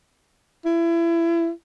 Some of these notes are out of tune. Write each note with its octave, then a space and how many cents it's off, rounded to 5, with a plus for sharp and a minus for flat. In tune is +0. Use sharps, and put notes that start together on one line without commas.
E4 +30